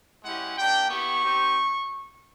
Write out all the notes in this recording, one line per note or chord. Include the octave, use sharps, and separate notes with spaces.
G#3 C#4 E4 G4 F#5
A#3 D4 G4 G5
B3 E4 G4 C#6
C4 D#4 G4